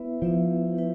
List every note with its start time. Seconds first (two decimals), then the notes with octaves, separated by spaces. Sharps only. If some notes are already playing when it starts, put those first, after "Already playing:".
Already playing: B3 E4 B4 E5
0.22 F3 B3 E4 B4 E5
0.78 E4 B4 E5